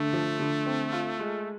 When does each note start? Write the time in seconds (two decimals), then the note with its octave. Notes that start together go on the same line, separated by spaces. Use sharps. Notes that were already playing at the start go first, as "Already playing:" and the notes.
Already playing: D3 A3
0.13 F3
0.40 D3
0.66 C4
0.92 F4
1.19 G#3